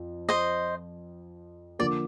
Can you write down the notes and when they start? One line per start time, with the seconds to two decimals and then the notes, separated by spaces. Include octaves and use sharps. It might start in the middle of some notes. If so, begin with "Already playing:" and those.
Already playing: F2
0.29 C5 D#5
1.79 D3 F3 A#3 D5